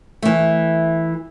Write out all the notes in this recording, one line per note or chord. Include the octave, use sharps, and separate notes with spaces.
E3 A3